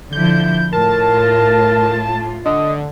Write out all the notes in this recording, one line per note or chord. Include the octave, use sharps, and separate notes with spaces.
D3 F3 E4 G6
A2 F4 A#4 A5
D3 D#5